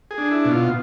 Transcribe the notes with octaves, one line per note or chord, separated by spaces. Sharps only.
G#4
D4
E4
B2
F4